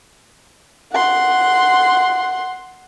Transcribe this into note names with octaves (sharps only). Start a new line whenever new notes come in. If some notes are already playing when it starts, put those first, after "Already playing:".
F#5 C6